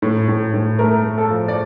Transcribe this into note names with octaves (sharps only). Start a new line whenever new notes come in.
A2
A2
A2
A3 A#4
A3
A4
F3
D5